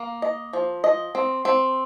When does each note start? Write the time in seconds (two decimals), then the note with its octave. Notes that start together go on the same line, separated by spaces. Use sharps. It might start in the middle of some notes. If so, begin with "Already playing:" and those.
Already playing: A#3
0.22 D#5
0.53 F3
0.84 D#5
1.15 C4
1.45 C4